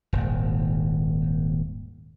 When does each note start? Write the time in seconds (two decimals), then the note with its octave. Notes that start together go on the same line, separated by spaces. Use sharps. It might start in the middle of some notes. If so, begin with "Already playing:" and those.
0.13 D#1 G#1 D#2